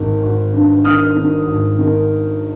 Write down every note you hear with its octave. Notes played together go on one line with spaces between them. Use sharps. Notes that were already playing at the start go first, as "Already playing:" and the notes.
Already playing: G#1 D#3
G#1
G2
D#3 D#6 F6
D#3
G#1
D#3